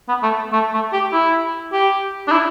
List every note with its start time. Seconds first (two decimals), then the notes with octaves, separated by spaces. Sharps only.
0.09 B3
0.23 A3
0.53 A3
0.74 A3
0.93 G4
1.13 E4
1.73 G4
2.28 D4
2.32 E4